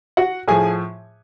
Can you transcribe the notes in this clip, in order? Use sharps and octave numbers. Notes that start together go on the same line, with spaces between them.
F#4 F#5
A2 F3 G#4 G#5